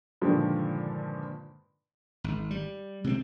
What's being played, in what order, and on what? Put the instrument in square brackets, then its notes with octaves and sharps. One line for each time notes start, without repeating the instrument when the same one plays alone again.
[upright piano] G2 A#2 D3 D#3 F3 G#3
[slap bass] G#1
G3
C3 G#3 B3 C4